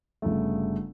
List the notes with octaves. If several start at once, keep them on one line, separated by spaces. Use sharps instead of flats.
G1 C#3 A3